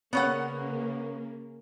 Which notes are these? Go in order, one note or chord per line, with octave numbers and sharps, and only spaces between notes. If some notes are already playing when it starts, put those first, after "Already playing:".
C#3 A#3 B3 C#4 F#5